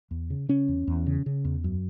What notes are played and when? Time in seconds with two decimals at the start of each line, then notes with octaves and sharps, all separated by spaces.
0.11 E2
0.30 C#3
0.49 C#3 C#4
0.68 E2
0.87 E2
1.06 C#3
1.26 C#3
1.45 E2
1.64 F#2